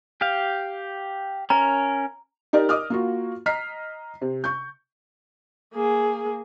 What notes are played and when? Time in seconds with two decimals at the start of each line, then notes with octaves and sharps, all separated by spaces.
0.21 G4 F5
1.50 C#4 A#4 A#5
2.53 D#4 G4 A#4 D5
2.69 D#5 D6 D#6 F6
2.90 A#3 F4 F#4
3.46 D#5 A#5 F6 B6 C7
4.21 C3
4.44 C#6 G6
5.74 A#3 G#4